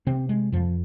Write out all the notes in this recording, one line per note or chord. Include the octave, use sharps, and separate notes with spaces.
C3 C4
G#3
F2 F3